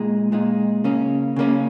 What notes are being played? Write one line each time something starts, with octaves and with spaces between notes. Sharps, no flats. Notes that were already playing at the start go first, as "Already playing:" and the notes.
Already playing: A#2 G#3 D#4
A#2 G#3 D#4
C#3 A#3 C#4
C#3 A#3 C#4